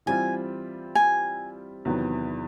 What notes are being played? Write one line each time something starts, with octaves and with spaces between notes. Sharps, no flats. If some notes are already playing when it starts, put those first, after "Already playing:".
E3 G3 C4 F4 G#5
G#5
E2 C3 D#3 F#3 B3